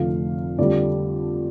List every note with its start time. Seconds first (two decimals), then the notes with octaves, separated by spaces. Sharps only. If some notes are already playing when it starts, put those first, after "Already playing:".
Already playing: F1 F2 D3 F3 A3 F5
0.58 F2 D3 G3 D5